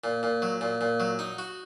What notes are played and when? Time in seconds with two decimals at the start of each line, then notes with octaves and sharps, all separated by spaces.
0.04 A#2
0.23 A#2
0.42 F#3
0.61 A#2
0.81 A#2
1.00 F#3
1.19 D#4
1.39 F#4